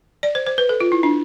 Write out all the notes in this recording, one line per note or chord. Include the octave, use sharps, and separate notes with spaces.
D5
C5
C5
B4
A4
F4
E4
D4